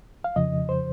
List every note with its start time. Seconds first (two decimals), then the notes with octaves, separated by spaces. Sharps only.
0.24 F5
0.36 F2 C#3 F3 D#5
0.69 C5